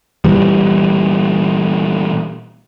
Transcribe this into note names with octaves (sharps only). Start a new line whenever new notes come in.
A#2 E3 G3